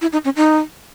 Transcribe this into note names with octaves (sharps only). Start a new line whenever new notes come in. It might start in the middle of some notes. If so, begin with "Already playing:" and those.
E4
D#4
C#4
D#4